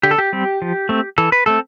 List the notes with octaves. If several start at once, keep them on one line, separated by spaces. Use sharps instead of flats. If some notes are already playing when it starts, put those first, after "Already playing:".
D3 G4
A4
G4
G3 C4
F3
A3 C4
E3 A4
B4
A3 C4 A4